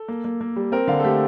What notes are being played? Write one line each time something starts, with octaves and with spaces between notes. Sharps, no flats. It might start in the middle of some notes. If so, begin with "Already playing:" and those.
Already playing: A4
A#3
A#3
A#3
G3
C4 A#4
D3 F5
A4
A3 G4